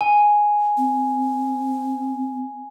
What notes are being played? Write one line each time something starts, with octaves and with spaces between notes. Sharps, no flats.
G#5
C4